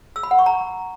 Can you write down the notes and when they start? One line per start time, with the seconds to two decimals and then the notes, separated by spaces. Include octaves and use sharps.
0.16 E6
0.23 B5
0.31 F#5
0.39 C#6
0.46 A#5